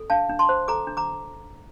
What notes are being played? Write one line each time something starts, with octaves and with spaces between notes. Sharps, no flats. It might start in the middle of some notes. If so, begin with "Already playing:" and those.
Already playing: A4
D4 F5 A5
D4
A5 C6
C5
A4 A#5 D6
D4
A#5 D6